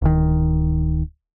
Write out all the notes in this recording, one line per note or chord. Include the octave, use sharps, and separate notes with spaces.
D1 D#3